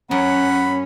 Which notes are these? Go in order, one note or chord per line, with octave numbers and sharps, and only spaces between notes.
F#2 C#4 F#5 B5